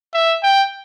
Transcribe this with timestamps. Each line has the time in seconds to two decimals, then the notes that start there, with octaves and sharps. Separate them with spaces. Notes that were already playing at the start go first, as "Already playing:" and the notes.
0.14 E5
0.43 G5